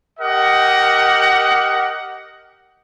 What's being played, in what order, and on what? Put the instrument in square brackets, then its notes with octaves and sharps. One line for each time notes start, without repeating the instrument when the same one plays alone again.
[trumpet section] G4 A#4 D#5 F#5